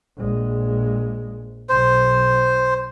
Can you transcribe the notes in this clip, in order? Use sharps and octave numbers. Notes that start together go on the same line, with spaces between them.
A#1 G#3
B1 C5